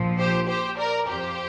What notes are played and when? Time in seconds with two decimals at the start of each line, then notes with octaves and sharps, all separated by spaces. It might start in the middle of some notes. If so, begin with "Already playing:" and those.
Already playing: A#1 A#2 F3
0.18 G4 C5
0.47 G4 C5
0.77 A#4 D5
1.07 F2 F3 G4 C5